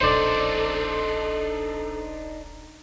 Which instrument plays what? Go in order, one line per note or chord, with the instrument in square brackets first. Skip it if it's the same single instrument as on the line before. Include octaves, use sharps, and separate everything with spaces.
[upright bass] D1 A#1 [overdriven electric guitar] D4 D#4 [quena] A4 [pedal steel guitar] C5 D5